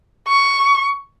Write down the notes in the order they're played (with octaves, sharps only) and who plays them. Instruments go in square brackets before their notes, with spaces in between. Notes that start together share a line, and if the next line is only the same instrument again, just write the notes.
[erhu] C#6